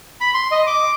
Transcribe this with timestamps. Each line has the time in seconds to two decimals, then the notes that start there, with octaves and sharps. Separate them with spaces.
0.21 B5
0.34 C6
0.51 D#5
0.67 D6